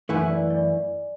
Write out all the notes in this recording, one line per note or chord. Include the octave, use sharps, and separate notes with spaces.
F#2 E3 A3 E4 B4 G#5
D5
D5